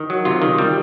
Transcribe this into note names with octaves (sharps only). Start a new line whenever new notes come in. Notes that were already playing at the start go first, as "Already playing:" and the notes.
Already playing: D#3
F#3
C3 F4
D#3
G3